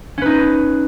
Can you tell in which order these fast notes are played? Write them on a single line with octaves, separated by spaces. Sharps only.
C#4 B4 D#4